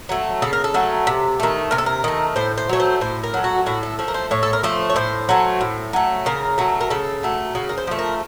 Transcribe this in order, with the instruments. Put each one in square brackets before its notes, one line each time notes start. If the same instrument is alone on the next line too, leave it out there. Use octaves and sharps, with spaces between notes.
[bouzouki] F#3 A3
C#3 A4
A#4
A4
F#3 A3
C3
D#3 A3
C3 A#4
A4
A#4
D#3 A3
A2 C5
C5
F#3 A3 C#5
C5
A2 C5
A#4
F#3 A3
F#4
A2 F#4
A4
F3 A3
A#4
C5
A2 C#5
A4
A#4
F3 A3 C5
C#5
A2 C5
F#3 A3
A2
F#3 A3
C#3 A#4
F#3 A3
A#4
C#3 A4
F#3 A3
C#3 F#4
A#4
C5
F3 A3
A#4